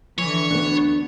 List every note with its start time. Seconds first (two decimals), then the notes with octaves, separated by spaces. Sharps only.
0.19 D3 E3 C#5
0.51 D2 B3 D4